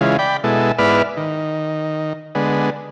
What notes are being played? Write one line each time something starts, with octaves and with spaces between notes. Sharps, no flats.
C#3 E3 G#3 F4
D5 G5 B5
B2 G#3 E4 A4
G#2 B3 E4 B4 D5 F6
D#3
D3 G#3 B3